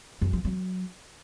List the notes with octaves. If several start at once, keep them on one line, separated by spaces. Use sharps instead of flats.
F#2
F3
F#3